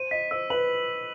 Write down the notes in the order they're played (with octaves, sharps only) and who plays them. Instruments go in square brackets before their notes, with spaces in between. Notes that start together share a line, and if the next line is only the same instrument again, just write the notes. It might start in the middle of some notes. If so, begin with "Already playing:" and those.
Already playing: [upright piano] C5 [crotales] D#7
[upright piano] D#5 [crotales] B6
[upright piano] C5 [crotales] E6
[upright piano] B4 [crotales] F#7